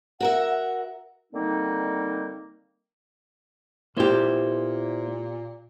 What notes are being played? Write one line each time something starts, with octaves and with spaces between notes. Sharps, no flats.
F#4 A#4 E5 F#5
F#5
D3 D#3 G3 A#3 C4 D#4
A#2 A#3 B3 E4 G4 C5